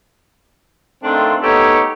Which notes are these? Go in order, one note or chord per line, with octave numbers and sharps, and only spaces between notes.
D#3 A3 C4 D4 F4
A3 B3 D#4 G4 C#5